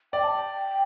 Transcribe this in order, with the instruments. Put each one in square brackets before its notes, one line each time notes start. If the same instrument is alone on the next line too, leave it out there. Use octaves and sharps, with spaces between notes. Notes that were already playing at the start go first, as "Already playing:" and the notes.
[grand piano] D5 [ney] G5
[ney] A5
G5